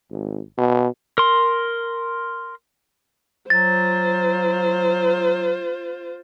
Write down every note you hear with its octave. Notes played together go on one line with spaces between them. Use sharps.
G#1
B2
A#4 C6
F#3 F4 C5 A6